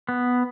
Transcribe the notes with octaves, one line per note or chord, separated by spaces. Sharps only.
B3